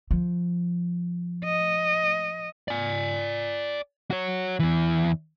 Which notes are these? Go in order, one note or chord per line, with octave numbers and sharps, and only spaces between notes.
F3
D#5
D5 G#5
F#4 C#5
E2 E3